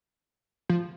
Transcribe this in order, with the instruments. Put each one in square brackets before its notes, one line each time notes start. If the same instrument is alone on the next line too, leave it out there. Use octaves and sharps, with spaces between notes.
[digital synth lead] F3